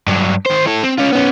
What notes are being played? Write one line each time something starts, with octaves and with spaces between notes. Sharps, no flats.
G2 F#3
D#3 C5
E4 A4
C4
C#4 F4
B3 C#4